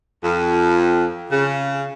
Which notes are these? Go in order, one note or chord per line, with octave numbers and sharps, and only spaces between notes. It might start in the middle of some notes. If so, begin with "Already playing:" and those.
F2
C#3